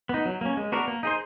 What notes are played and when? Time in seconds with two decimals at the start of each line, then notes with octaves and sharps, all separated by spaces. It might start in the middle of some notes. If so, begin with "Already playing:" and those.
0.09 B3 D#4
0.26 F#3
0.41 A#3 C#4
0.57 G#3
0.72 B3 D4 F#4 A#4
0.88 A#3
1.03 D#4 G#4 C5